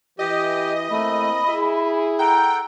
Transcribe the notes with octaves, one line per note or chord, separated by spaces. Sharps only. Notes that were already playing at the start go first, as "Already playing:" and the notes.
E3 G4 D#5
A3 A#3 C4 E4 B5
E4 G#4 E5
A4 F#5 G5 A#5